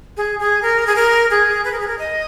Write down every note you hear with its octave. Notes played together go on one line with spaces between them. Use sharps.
G#4
G#4
A#4
G#4
A#4
G#4
B4
A#4
G#4
A#4
D#5